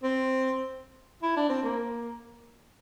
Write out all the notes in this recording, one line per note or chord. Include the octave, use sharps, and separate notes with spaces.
C4
E4
D4
C4
A#3